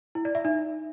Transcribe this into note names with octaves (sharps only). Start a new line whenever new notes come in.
E4
D5
E5
D#4